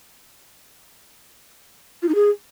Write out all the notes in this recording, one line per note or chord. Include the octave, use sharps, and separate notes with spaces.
F4
D#4
G#4